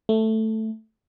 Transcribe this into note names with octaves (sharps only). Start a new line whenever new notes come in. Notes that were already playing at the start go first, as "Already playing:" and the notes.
A3